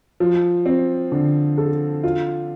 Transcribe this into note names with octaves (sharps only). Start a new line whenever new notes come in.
F3
C4
D3
A4
F4